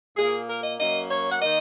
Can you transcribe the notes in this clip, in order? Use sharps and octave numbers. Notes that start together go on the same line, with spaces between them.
A#2 A#3 G#4
A#4
D#5
F#2 F#3 A#3 D#5
C#5
F#5
D#3 A#3 D#5